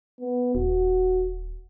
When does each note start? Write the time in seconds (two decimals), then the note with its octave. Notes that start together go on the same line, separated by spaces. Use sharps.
0.20 B3
0.55 D#1 F#4